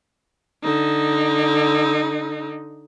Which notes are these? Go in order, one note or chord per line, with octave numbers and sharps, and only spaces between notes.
D3 D#4